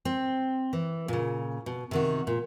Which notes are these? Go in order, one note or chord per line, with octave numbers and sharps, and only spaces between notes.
C4
E3
A#2 C#3
B2
C3 D#3 F#4
A#2